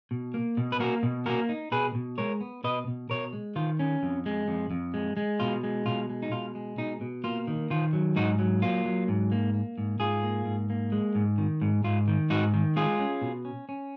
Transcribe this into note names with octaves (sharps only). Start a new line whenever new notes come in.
B2
A#3
B2
B4
A#3 F#4 A#4
B2
A#3 F#4 A#4
D#4
B2 G#4 B4
B2
G#3 A#4 C#5
B3
B2 B4 D#5
B2
B2 A#4 C#5
G#3
D#3 F4
C#4
F2
G#3
F2
F2
G#3
G#3
B2 F4
G#3
B2 F4
G#3
D#4
B2 F4
G#3
B2 D#4
B2
A#3 F4
D#3
D#3 F4
F#3
G#2 D#4 F#4
F#3
A#3 F4
F#3
G#2
A#3
A#3
G#2
G#2 F4 G#4
A#3
G#2
A#3
G#3
G#2
D#3
G#2
G#2 F4
D#3
G#2 D#4 F#4
D#3
G#3 F4 G#4
C#4
B2
C#4
C#4